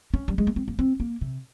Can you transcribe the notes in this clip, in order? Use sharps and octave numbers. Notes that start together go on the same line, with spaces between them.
C#4
G3
G#3
A#3
C4
A#3
C4
A#3
C3